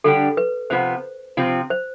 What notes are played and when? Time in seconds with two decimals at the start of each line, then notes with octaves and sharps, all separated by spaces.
0.04 D3 G3 D4 G4 A4
0.37 B4
0.70 C3 F3 B3 C5
1.37 C3 F3 C4
1.70 C5